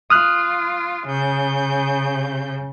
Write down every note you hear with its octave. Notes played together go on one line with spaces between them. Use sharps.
F4 D#6 F6 F#6
C#3 G6